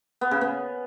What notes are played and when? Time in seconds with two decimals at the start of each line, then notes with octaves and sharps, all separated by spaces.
0.21 B3
0.31 C#3
0.41 B3